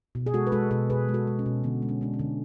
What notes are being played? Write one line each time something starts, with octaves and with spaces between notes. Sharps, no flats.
B2
G#4
G#3 F#4 A4
B4
G#3 F#4 A4
B2 F#4 A4
B2 G#4 B4
G#3
F#4 A4
G#3
C#4
B2
D3 B3
G#3
C#4
G#3 D4
C#4
D3